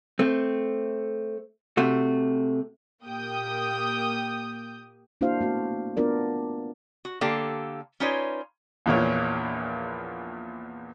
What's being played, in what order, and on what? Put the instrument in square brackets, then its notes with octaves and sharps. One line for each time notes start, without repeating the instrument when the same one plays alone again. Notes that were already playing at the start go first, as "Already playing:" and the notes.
[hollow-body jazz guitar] A3 C4
C3 A3 F#4
[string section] A#2 A#3 G4 G5 D#6 G6
[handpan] A#3 D4 E4 F#4 C5 F5
A3 B3 F#4
B3 D4 F4 A#4 D5
[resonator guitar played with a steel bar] F#4
D3 A#3 G4 A4 F5
C#4 D#4 F4 B4 C#5 D5
[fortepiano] A#1 E2 A#2 C#5